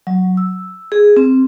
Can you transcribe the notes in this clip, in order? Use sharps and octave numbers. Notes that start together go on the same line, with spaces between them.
F#3
E6
G#4
C4